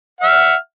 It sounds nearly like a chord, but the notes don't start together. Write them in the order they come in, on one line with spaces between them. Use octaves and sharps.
F#5 E5 F6